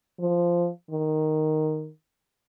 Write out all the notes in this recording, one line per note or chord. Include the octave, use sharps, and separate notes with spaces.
F3
D#3